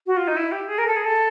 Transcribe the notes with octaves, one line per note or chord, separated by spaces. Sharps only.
F#4
F4
D#4
E4
G4
G#4
A#4
A4
G#4
A4